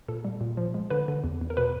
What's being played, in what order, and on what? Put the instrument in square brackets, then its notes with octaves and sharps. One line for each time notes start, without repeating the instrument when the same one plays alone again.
[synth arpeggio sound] A#2 A4
G3
A#2
F3
G#3
D3 B4
D3
E2
E2
A#4
B2 B4